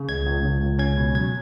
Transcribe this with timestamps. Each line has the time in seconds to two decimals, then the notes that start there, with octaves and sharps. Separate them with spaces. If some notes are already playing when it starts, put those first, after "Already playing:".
Already playing: C#3
0.09 C#2 G#6
0.26 C#2
0.44 C#2
0.61 C#2
0.79 C#4 G#6
0.97 B2
1.15 F#3 G#6